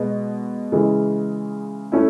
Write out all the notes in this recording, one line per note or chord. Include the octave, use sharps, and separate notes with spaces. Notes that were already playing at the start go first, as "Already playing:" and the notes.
Already playing: B2 G#3 B3
C#3 E3 G#3
A3 C#4 E4